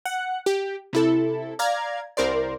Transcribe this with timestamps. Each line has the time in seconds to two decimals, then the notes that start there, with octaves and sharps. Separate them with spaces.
0.05 F#5
0.46 G4
0.93 C3 E4 A4
1.59 D5 F5 A#5 G#6
2.17 C2 A#4 C5 D5